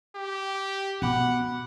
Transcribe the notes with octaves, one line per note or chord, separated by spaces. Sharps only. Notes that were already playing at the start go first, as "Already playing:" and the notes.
G4
B2 B3 F#5 B5 D6